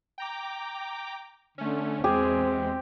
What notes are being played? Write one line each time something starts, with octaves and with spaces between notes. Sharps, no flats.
G5 A#5 D6
D3 A3 C#4
E2 G#3 C4 G4 G#4